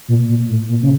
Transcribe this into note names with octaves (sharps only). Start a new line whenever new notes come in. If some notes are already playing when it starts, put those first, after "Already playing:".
A#2
A#2
A2
A#2
C#3